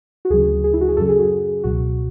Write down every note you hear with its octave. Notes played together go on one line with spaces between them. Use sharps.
F#4
D2 C#3 F#3 G#4
G#4
E4
F#4
G#4
F#2 C#3 F#3 A4
G#4
F#4
C#2 B2 F#3 F#4